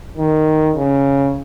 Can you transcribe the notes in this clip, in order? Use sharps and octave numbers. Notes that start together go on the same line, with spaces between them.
D#3
C#3